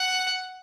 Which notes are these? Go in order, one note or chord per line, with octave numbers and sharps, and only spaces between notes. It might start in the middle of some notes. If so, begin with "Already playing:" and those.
Already playing: F#5